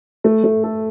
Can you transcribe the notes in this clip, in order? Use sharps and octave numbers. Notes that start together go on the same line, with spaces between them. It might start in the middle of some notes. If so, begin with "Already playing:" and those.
A3
A3
A4